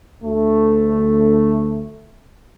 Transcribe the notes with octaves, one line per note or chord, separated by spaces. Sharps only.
D2 A3